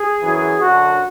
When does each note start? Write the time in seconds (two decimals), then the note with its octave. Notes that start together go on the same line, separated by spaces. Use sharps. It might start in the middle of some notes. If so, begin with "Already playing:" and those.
Already playing: G#4
0.22 F#2 E3
0.61 F#2 D3 F#4